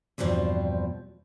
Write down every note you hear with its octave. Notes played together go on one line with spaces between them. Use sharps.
E2 G2 B2 F3 C4